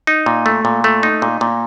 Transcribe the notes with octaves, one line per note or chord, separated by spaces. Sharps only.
D#4
A#2
A3
A#2
A3
D#4
A#2
A#2